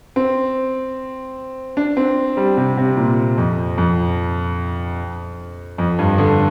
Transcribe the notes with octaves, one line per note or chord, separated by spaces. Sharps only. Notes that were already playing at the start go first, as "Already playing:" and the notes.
C4
D4
C4
G3
C3
C3
A#2
F2
F2
F2
G2
D3